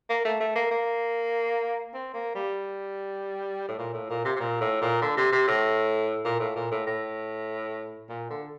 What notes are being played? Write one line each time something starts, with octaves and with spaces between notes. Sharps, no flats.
A#3
A3
A3
A#3
A#3
C4
A#3
G3
A2
A#2
A2
A#2
C3
C3
A#2
A2
A#2
D3
C3
C3
A2
A#2
A2
A#2
A2
A2
A#2
D3